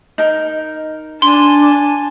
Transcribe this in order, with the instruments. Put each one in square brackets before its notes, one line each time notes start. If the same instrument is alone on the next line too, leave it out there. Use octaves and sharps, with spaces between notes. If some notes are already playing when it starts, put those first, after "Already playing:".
[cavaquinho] D#4 A#4
[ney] D4 [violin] G#5 A5 [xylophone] C6